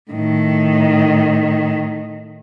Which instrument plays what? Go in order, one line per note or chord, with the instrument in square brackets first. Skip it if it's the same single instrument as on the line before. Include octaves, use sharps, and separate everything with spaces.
[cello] A2 D#3